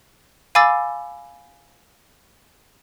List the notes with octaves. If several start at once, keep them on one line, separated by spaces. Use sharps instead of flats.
F5 G#5 B5 D6 E6 A6